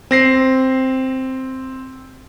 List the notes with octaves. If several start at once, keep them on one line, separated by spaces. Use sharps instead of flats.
C4 A#6 C7